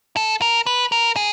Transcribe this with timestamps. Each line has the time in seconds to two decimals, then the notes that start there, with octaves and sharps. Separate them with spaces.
0.17 A4
0.42 A#4
0.66 B4
0.92 A#4
1.16 G#4